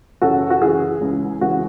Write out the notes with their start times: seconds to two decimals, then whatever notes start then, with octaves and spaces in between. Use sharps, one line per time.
0.22 F#2 C#3 E3 F#4 A4
0.50 F#4
0.61 F#2 C#3 E3 E4 G#4
1.01 C#2 C#3 E3
1.41 C#2 C#3 E3 F#4